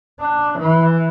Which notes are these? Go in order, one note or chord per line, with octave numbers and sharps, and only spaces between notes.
D4
E3